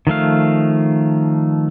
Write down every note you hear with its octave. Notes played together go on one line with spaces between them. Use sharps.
D#3 F3 A3 F5